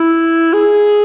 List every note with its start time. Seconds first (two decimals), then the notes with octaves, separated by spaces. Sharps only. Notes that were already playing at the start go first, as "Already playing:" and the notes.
Already playing: E4
0.53 G#4